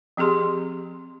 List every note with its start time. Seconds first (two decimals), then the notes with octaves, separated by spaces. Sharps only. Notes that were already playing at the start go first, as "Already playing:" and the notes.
0.17 F3 C4 G4 G#4 C6